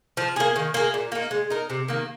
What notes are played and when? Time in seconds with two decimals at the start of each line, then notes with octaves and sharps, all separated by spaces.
0.17 F3
0.36 A#3 G#4
0.56 D#3
0.74 A#3 G#4
0.94 A#2
1.12 A#3 D#4
1.31 G#3
1.50 D#4 A#4
1.70 C3
1.88 D#3 A#3